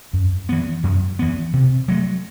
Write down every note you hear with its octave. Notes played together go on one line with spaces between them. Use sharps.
F#2
E3 B3
F#2
E3 B3
C3
F#3 A3